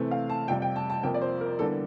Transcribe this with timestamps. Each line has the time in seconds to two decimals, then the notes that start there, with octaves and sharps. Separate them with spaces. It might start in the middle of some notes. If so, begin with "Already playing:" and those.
Already playing: C3 E3 A3 C4
0.11 F5
0.30 A5
0.48 F2 C3 G3 G5
0.62 G5
0.76 A5
0.90 A5
1.03 F2 C3 F3 A#3 G5
1.14 D5
1.22 C5
1.41 A#4
1.59 E2 D3 G3 A#3 A4